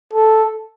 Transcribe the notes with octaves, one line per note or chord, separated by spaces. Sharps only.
A4